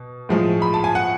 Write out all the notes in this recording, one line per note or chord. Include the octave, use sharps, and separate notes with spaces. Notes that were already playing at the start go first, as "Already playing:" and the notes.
Already playing: B2
A2 F3 G#3
B5
A5
G#5
F#5